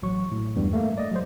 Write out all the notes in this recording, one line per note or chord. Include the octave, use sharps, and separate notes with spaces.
A1 F#3 C#6
A2
E2 G2 G3
A3 A#3
D5 D#5
F#3 G#3 C5